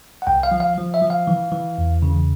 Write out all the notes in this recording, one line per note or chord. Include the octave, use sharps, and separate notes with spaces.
F#5
C2 G5
F5
F3
F5
F3
E5
F3
F5
E3
E3
E2
C#3